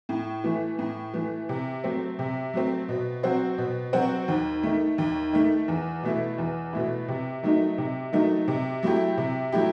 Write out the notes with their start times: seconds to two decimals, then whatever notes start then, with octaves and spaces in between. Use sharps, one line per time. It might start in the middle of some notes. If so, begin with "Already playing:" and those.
0.09 A2
0.44 E3 A3
0.79 A2
1.14 E3 A3
1.49 C3
1.84 F#3 A3 C4
2.19 C3
2.54 F#3 A3 C4
2.89 B2
3.23 F#3 C4 F#4 C5
3.58 B2
3.93 F#3 C4 F#4 C5
4.28 D#2
4.63 D#3 A3
4.98 D#2
5.33 D#3 A3
5.68 E2
6.03 B2 A3 E4
6.38 E2
6.73 B2 A3 E4
7.08 C3
7.43 D#3 F#3 A3 D#4
7.78 C3
8.13 D#3 F#3 A3 D#4
8.48 C3
8.83 F#3 A3 E4 G4
9.18 C3
9.52 F#3 A3 E4 G4